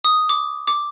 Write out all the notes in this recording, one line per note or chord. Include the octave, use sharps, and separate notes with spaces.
D#6
D6
D6